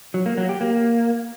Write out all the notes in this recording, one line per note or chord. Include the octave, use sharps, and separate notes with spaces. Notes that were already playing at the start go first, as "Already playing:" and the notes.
F#3
A#3
F#3
G4
A#3